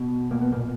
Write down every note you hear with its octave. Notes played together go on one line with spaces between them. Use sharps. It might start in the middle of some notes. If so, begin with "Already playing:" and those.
Already playing: B2
B2 A#3
B3
A#2 A#3